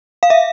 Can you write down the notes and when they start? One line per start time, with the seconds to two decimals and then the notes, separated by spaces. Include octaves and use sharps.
0.23 F5
0.30 E5